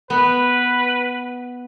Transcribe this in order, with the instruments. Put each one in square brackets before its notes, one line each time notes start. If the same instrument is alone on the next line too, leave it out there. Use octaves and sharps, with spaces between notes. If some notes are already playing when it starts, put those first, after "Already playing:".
[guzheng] B3 [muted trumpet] B4